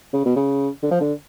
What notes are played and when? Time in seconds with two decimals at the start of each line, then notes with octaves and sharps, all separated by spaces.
0.13 C#3
0.25 B2
0.36 C#3
0.83 D3
0.91 F3
1.00 D3